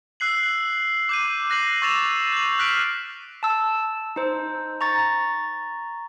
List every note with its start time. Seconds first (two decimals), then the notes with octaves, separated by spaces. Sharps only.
0.20 E6 F#6 C7 F#7
1.09 D6 G6 D#7
1.50 F#6 A#6 C7 F#7
1.82 C#6 E6 A6 A#6 E7 F7
2.33 G6 F#7
2.59 F6 F#6 B6 C7 D7
3.43 A5 E6
4.16 D#4 C5
4.81 A#5 C#6 A6